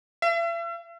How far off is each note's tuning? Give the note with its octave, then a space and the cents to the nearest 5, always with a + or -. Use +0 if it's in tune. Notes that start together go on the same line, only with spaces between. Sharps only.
E5 +45